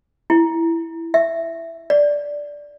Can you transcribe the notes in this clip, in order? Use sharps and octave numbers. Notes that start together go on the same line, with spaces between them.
E4
E5
D5